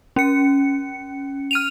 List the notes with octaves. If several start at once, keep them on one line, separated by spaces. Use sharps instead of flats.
C#4 C#7
F6 D#7 F7